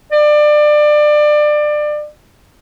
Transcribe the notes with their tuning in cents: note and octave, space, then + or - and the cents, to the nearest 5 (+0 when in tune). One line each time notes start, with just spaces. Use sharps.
D5 +25